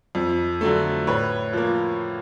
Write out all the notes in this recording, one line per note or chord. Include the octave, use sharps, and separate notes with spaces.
F2
D3 F#3 A3
A2 B4 C#5
F3 A#3